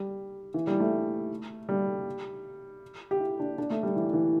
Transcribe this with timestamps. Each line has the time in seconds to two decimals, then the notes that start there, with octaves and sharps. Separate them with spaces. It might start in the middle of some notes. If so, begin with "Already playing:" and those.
Already playing: G3
0.54 E3
0.67 G3
0.80 A3
1.69 G3
3.11 G4
3.20 E4
3.40 D4
3.58 D4
3.70 A3
3.83 G3
3.96 E3
4.13 E3